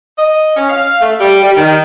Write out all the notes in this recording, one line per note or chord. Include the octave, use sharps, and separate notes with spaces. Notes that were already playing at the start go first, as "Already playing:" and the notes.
D#5
C#4
F5
A3
G3
G3
D#3